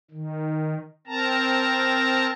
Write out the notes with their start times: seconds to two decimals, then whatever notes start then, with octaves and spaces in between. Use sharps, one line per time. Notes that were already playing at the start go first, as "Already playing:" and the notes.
0.11 D#3
1.07 C4 A#4 A5 A#5